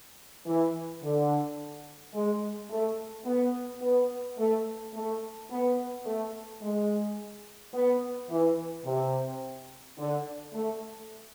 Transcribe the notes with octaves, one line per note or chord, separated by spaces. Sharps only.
E3
D3
G#3
A3
B3
B3
A3
A3
B3
A3
G#3
B3
E3
C3
D3
A3